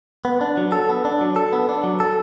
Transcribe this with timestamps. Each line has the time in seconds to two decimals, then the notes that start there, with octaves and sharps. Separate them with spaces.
0.25 B3
0.41 D4
0.57 F#3
0.72 A4
0.89 B3
1.05 D4
1.21 F#3
1.36 A4
1.53 B3
1.69 D4
1.84 F#3
2.00 A4